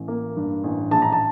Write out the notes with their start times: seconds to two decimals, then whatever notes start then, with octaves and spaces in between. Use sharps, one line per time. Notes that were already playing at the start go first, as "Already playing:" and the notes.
Already playing: A1
0.08 A#3
0.37 G2
0.64 A1
0.91 A#1 A5
1.02 A#5
1.12 A5